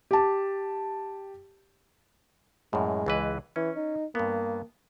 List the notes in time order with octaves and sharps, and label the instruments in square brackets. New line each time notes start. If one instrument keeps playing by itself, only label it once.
[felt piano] G4 A5
[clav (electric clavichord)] F#2 A2 [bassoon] G#3
[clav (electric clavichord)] C#2 E3 B4
[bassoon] E3 [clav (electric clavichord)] C#4
[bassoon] D#4
[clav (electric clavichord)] G2 B3 [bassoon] A#3